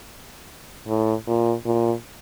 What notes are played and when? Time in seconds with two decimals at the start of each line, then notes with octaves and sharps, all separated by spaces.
0.88 A2
1.27 A#2
1.65 A#2